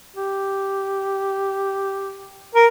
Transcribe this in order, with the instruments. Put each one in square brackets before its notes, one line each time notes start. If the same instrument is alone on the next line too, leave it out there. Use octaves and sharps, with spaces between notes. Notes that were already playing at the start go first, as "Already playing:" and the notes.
[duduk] G4
[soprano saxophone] A#4